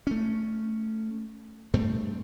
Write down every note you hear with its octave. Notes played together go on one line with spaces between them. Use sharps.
A3 C#4
G2 A3 C4